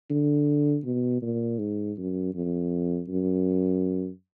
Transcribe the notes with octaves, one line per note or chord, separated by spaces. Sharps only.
D3
B2
A#2
G#2
F#2
F2
F#2